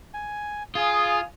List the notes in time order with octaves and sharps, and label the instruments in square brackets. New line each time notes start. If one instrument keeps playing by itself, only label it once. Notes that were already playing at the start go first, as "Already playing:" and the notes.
[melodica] G#5
[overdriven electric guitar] F4 [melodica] G#4 [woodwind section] F5 G#5 D#6